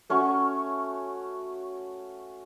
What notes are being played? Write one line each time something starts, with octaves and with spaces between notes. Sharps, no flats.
A3 C#4 F#4 C#6